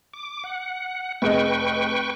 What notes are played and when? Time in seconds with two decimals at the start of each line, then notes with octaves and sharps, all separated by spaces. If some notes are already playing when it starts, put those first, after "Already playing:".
0.14 D6
0.44 F#5
1.22 F1 G#4 B4 D#5 G5 C#6